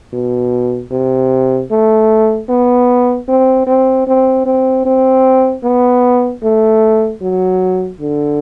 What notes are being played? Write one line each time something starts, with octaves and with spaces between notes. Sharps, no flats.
B2
C3
A3
B3
C4
C4
C4
C4
C4
B3
A3
F#3
D3